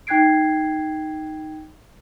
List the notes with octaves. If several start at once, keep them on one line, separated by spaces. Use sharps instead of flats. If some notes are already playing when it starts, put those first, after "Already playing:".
D#4 G5 F#6 G#6 C7 D7